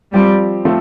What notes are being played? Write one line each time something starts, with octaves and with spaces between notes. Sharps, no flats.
F3 G3 C4 G4
F3 A3 C4